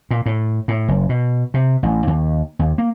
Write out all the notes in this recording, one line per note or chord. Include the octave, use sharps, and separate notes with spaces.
A#2
A2
A2
F#1
B2
C3
A1
D#2
D#2
A#3